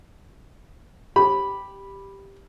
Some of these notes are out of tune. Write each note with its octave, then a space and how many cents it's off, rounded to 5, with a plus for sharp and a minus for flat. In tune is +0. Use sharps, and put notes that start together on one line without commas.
G4 +0 B5 -5